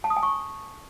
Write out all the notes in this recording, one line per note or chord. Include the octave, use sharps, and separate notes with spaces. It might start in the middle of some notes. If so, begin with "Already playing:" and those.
A5
D#6
G#5
C#6